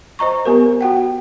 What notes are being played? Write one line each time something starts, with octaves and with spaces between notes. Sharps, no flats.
C5 D#5 A#5 C#6
B3 G4 A#4
F#4 F#5 G5